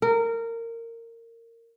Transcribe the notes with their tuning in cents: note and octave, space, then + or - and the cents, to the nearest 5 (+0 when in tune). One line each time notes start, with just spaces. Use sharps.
A#4 -20